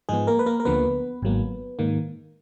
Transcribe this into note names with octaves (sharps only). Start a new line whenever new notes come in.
G#2 F3 G#3 B3 G#4
A#3 A#4
B4
A#3 A#4
A#4
D2 D3 F3 A#3 B3 B4
G#1 G#2 F#3 A#3
G#2 D#3 A#3